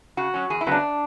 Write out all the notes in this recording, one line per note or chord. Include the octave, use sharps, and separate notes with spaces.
C#3 F#4
F#3 C#4
E2 G#4
E4
C#3 F#3 B3
D4